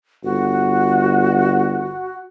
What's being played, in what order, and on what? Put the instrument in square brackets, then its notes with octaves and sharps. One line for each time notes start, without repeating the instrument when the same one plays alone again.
[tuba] G1 [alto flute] F#4